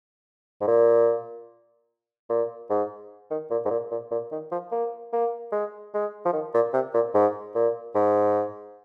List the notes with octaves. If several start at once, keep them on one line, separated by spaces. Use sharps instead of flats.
G#2
A#2
A#2
G#2
D#3
A#2
G#2
A#2
A#2
A#2
D#3
F3
A#3
A#3
G#3
G#3
F3
D#3
A#2
C3
A#2
G#2
A#2
G#2